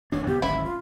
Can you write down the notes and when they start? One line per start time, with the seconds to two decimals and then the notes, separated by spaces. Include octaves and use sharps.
0.12 D#1 E3 D4 C#5
0.27 C#2 B3 G4
0.42 D1 G#1 C#4 E4 E5
0.64 F4